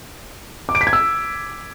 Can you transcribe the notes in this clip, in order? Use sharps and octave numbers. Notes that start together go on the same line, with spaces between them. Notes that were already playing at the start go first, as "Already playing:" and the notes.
D6
D7
B6
G#6
E6